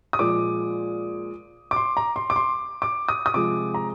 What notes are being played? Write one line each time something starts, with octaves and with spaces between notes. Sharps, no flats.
D#6
A#2 F3 G#3 D6
D6
C6
A#5
C6
D6
C6
D6
D#6
D#6
C3 F3 G#3 D6
A#5